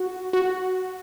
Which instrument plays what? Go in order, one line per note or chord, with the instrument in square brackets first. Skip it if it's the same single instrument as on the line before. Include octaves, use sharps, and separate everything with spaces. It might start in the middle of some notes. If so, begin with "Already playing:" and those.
Already playing: [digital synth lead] F#4
F#4